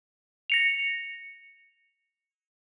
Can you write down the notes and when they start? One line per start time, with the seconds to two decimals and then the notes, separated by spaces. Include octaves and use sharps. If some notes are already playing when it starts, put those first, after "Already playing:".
0.50 A#6 C#7 F7